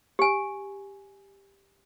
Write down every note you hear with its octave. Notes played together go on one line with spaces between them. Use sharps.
G4 G#5